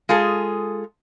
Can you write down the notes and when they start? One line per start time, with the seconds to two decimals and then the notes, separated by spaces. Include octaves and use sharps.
0.09 G#3 F4 G#4 A4